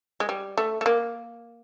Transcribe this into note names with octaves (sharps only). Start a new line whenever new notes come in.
G#3
G3
A3
A3
A#3